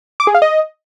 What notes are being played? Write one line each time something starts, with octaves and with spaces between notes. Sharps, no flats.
D6
G#4
F5
D#5